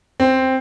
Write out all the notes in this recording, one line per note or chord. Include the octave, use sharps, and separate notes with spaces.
C4